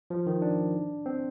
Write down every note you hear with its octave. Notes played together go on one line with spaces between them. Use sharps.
F3
D#3
D4
C4